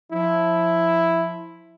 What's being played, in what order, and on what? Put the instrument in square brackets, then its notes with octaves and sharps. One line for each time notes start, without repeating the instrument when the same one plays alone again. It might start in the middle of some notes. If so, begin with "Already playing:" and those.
[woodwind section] F3 [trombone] E4